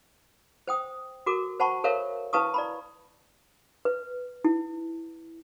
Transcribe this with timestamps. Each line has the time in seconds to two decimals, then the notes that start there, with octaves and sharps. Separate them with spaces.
0.68 C5 G5 D#6
1.26 F#4 A4 A#4 D6
1.60 C5 F#5 A5 B5 C#6
1.84 A4 A#4 C5 C#5 E5 F5
2.33 E4 B4 F5 A5 C#6 D#6
2.54 D5 A#5 B5
3.85 B4
4.44 E4